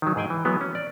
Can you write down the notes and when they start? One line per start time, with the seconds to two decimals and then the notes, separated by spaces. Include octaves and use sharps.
0.02 D#3 F#3
0.16 G#2 G#4 G5 G#5
0.30 E3
0.45 E3 F#3 G#3 B3
0.61 C#4
0.75 D5